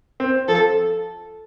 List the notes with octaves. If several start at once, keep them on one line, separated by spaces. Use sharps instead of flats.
C4
F3 A4